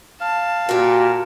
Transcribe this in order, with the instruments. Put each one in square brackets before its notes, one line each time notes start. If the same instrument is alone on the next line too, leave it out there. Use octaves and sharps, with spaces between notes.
[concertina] F5 [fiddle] A5
[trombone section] A#2 [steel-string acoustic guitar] F#4 G4